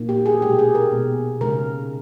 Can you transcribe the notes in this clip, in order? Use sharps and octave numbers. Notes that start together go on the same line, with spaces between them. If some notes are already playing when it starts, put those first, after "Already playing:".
Already playing: A#2 A#3 D#4
G4
G#4
B2 G#3 D#4 G4
G#4
A#4
B2 G#3 B3
C#3 G#3 D#4 A#4